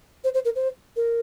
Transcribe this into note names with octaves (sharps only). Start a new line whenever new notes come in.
C5
C5
A#4
C5
A#4